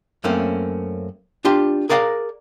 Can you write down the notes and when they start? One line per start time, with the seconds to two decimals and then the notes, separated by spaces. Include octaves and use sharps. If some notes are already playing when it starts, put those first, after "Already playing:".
0.24 F#2 A3 A#3 C4 C#4
1.45 D4 F4 G4 C6
1.89 G#4 A#4 D5 F5 F#5 A#5